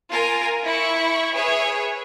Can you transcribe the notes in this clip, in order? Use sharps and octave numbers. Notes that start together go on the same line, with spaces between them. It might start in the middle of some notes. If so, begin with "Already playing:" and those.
F4 A#4 G#5
E4 E5 C#6
G#4 B4 C#5 E5